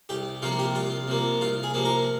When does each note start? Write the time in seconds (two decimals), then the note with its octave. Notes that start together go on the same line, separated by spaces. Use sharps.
0.09 C2 G4
0.42 C3 F3 A#3 F4
0.59 G4
0.75 C2 F4
1.08 C3 F3 A#3
1.40 C2 F4
1.63 G#4
1.74 C3 F3 A#3
1.85 A#4